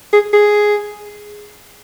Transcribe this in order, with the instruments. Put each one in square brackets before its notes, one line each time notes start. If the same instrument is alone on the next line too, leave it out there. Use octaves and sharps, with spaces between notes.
[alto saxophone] G#4
G#4